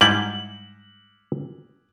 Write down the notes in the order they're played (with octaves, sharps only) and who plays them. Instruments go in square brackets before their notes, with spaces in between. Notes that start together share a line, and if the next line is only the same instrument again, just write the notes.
[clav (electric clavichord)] G#2 G3 E4 [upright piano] F#7